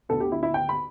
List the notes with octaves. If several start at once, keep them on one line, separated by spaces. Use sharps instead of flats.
D2 D3 B3 A4
G4
E4
E4
G5
B5